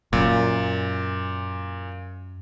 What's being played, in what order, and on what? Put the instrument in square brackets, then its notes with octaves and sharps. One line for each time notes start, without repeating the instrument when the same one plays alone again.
[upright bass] F#2 [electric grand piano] A#2